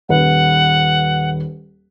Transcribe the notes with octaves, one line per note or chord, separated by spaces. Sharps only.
D#1 B4 F#5